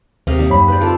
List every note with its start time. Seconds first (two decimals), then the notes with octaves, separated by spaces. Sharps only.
0.27 D#2 C3 D#5 F5
0.38 G3 A#3 D#4
0.50 F#2 B5
0.68 B4 C5 D5
0.81 C4 F4 A4